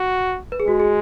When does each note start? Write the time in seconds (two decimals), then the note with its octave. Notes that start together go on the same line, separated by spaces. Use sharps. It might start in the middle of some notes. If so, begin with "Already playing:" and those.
Already playing: F#4
0.52 B4
0.60 G#4
0.67 G#3 F#4
0.80 G#4